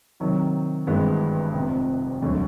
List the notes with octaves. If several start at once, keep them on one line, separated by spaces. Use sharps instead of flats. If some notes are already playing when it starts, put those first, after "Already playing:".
C3 D#3 F#3
G#1 G2 E3 G#3 B3
F1 F2 C3
E1 D2 D3 F#3 A3